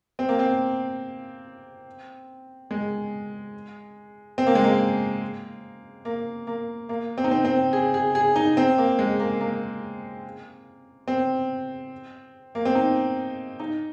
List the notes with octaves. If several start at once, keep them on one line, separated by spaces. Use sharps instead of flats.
C4
A#3
C4
G#3
C4
A#3
G#3
A#3
A#3
A#3
A#3
C4
D#4
C4
C4
G#4
G#4
G#4
D#4
C4
A#3
G#3
A#3
A#3
C4
A#3
C4
D#4
D#4